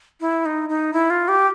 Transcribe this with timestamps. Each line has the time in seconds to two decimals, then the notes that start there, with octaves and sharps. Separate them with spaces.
0.21 E4
0.46 D#4
0.69 D#4
0.93 E4
1.10 F4
1.28 G4